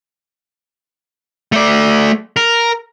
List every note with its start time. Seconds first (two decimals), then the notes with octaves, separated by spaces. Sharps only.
1.52 A3 D5
2.37 A#4